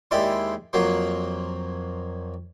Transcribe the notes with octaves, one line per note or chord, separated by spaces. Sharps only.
D#2 G#3 E4 G4 D5 C6
F2 F3 F#3 A#3 C6